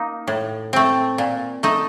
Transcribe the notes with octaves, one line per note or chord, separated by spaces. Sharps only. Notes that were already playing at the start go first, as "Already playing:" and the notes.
Already playing: A#3 D#4
A2
A3 C4
A#2
A3 D#4